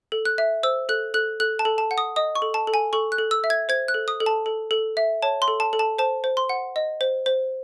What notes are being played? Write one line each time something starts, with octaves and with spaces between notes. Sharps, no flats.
A4
F#6
E5
C5 E6
A4 F#6
A4 F#6
A4 F#6
A5
A4
A5
F#5
D#6
D#5 D#6
C#6
A4
A5
A4
G#5
A4 C#6
F#6
A4
E6
E5
G#6
C5 G#6
F#6
A4
D#6
A4
A5
A4
A4
E5
C#5 A5
C6
A4
A5
A4
A5
C5 A5
C5
C6
F#5
D#5
C5
C5